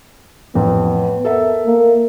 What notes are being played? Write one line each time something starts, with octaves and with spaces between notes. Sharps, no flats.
A1 F2 B3
A4 A#4 E5
A#3